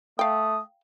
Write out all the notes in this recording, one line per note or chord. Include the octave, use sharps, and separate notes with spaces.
A3 F5 G5 D#6